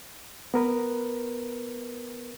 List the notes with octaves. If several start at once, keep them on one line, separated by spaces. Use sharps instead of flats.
B3 A#4 B4